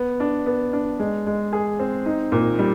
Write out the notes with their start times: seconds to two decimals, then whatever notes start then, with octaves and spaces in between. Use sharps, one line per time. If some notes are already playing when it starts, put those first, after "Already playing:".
Already playing: B3
0.20 D4
0.46 B3
0.73 D4
0.99 G#3
1.26 G#3
1.53 G#4
1.79 C4
2.06 D#4
2.32 A#2
2.59 G3